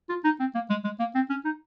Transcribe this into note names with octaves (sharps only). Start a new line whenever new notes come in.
F4
D#4
C4
A#3
G#3
G#3
A#3
C4
C#4
D#4